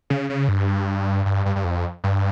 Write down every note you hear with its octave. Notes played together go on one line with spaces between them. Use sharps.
C#3
C#3
G2
G2
G2
G2
F2
G2